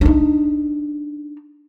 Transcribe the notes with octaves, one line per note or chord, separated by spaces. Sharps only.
D4 D#4